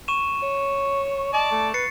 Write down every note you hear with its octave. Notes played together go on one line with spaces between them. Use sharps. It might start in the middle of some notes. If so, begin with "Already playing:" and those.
C#6 D#7 E7
C#5
D5 D#5 A5
A3
B4 A6 C7 C#7